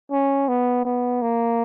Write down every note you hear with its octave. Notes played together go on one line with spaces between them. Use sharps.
C#4
B3
B3
A#3